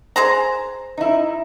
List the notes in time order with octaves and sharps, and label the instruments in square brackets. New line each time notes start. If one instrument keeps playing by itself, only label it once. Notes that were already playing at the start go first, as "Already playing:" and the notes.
[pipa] G#4 C5 A#5
[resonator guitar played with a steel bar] D#4 E4